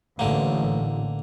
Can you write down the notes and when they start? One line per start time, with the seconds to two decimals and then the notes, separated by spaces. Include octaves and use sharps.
0.19 A1 D3 A#3